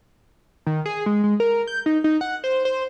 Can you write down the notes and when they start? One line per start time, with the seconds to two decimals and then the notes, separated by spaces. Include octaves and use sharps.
0.67 D#3
0.86 G#4
1.06 G#3
1.24 G#3
1.40 A#4
1.67 G6
1.86 D#4
2.04 D#4
2.21 F#5
2.44 C5
2.65 C5